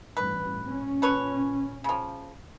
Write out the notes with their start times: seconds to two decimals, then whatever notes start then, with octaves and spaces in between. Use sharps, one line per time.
0.17 A1 G2 B4
0.65 A#2 C#4
1.02 A4 B4 C#5
1.84 C#3 F3